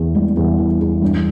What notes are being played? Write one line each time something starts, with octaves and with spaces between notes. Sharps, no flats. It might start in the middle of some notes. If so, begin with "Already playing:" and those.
Already playing: E2 E3
G3
E2
E3
E2
G2